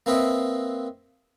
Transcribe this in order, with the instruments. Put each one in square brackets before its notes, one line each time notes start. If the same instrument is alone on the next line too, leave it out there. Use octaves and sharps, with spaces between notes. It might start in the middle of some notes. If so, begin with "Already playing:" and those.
[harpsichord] A#3 C4 B4 D#5 E5